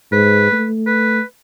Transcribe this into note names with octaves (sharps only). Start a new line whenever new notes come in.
G#2 B4
A3
B4